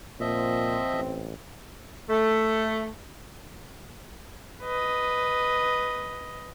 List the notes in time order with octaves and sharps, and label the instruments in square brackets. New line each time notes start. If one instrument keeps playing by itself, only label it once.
[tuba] A#2 [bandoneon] F3 D#5 E5 [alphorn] C4
[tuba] A1
[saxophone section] A3
[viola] B4 D#5